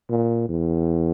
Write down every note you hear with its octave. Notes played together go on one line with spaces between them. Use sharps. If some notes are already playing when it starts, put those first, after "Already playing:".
A#2
E2